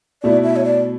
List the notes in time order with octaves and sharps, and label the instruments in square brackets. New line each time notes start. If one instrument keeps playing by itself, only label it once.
[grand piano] B2 A3 E4 [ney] D5
[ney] E5
C#5
D5